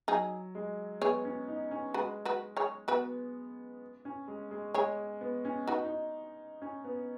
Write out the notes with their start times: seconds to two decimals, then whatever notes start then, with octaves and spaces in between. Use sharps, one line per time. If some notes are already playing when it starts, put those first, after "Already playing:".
0.08 F#3 D#4 G#4
0.55 G#3
1.02 B3 G#4 C#5
1.25 C#4
1.48 D#4
1.71 C#4
1.94 G#3 F#4 B4
2.25 F#4 B4
2.57 G#4 C#5
2.88 B3 F#4 B4
4.05 C#4
4.28 G#3
4.51 G#3
4.74 G#3 G#4 C#5
5.21 B3
5.45 C#4
5.67 D#4 F#4 B4
5.85 D#4
6.62 C#4
6.84 B3